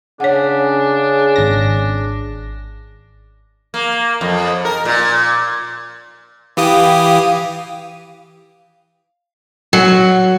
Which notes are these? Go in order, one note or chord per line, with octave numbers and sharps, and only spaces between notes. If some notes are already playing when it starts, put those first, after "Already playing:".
C#3 D4 G#4 C#5 F#5
G#1 A#6
A#3
F2
A#4
A#2
E3 G4 F5 D#6
F#3